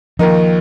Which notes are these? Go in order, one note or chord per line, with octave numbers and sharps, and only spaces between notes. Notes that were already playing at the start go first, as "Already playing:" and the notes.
D#2 D#3 F3 A#3 D#4